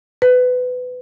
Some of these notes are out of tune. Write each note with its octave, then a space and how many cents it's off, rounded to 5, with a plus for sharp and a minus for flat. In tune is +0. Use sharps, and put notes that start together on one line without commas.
B4 +20